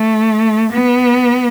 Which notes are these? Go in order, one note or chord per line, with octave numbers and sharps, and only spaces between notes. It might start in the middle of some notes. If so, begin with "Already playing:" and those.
Already playing: A3
B3